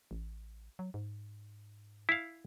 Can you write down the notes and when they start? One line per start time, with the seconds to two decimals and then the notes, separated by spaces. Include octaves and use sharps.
0.11 A1
0.79 F#3
0.94 G#2
2.09 E4 F5